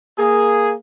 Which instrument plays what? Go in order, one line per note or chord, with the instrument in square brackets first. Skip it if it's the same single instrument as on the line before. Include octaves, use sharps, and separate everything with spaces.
[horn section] A#3 G#4